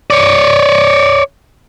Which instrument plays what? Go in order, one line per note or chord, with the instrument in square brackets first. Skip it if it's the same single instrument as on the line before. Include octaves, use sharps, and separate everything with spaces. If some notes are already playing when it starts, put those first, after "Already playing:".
[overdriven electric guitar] C#5 D5